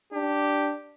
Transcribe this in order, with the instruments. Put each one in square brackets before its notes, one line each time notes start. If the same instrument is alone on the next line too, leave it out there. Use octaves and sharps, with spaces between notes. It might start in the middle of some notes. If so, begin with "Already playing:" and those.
[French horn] D4 [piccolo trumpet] G4